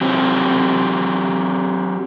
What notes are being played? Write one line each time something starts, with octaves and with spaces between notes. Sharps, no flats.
F#3 C4 G4